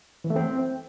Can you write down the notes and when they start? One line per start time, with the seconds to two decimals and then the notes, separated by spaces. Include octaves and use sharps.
0.24 E3
0.30 A3
0.36 C4